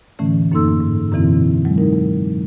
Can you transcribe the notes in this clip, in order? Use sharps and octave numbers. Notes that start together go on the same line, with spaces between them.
A2 D3 E3 A3 C#4
F#2 A#3 D#4 A4 C6 E6
G#2
F#2 B2 D3 E3 C4 E4
F#3 G#3
D#4 A#4